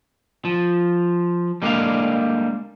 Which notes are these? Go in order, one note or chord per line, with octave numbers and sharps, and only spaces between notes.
F3
G3 G#3 A#3 D4 A4 F5